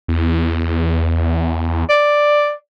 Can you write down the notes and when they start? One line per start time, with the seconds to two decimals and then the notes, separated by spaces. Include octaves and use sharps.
0.08 E2
1.89 D5